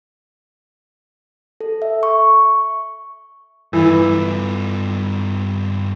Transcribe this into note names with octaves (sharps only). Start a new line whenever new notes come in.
A4
E5
C#6
G2 E3 F4